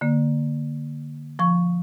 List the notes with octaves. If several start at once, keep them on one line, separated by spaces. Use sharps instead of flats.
D3 A#3
F3 C#6